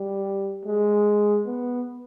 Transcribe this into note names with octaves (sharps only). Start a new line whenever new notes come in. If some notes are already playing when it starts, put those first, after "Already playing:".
Already playing: G3
G#3
B3